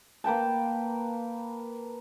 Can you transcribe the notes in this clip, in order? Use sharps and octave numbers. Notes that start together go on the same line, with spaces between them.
A#3 B4 G5 A5